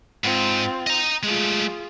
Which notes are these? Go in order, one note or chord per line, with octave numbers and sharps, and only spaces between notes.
G#2 C4 F4
D#5 A#5
G#3 A3 F4 G#4